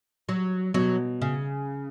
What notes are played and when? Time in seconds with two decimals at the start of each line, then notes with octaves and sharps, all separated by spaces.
0.29 F#3
0.74 B2 F#3
1.21 C#3